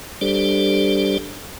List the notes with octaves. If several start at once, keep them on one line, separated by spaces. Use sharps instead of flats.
G3 D4 G4 A4 C5 D5